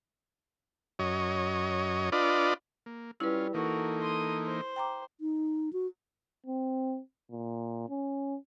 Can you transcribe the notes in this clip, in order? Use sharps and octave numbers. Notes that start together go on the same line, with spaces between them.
F#2 C#5 D#5
D4 F4 B4 D5 D#5
A#3
G3 C#4 E4 F4 B4
E3 A#3 D#4 F#4 A4 A#4
C6 D#6
C5
G5 A#5 D6
D#4
F#4
C4
A#2
C#4